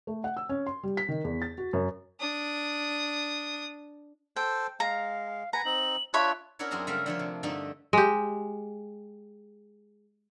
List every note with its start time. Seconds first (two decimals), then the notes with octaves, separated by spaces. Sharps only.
0.07 A3
0.24 F#5
0.37 E6
0.49 C#4
0.66 C6
0.83 G3
0.97 B6
1.08 D#3
1.24 E2
1.42 A6
1.58 F#4
1.73 F#2
2.20 D4 D#6
4.36 A4 C5 G5
4.80 G#3 F5 A#5
5.53 B4 F#5 G#5 A#5
5.65 C4 D#4 F#7
6.14 D4 F4 C#5 E5 B5 F#6
6.59 C#4 D4 E4 F#4 A#4 C#5
6.71 F#2 C4 E4 F#4 G#4 A#5
6.87 C#3 G3 A3 A#4 E5 F5
7.06 D3 F3 D4 C#5
7.19 C3
7.43 G2 D3 A3 D4 D#4
7.93 G#3 G4